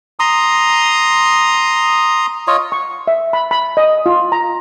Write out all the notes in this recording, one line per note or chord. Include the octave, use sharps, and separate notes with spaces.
A#5 C6 D#6
F4 C#5 D#5
C#6
E5
B5
B5
D#5
F4
A#5